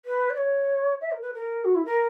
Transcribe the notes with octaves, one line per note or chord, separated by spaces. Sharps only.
B4
D5
C#5
E5
A#4
B4
A#4
F#4
E4
A#4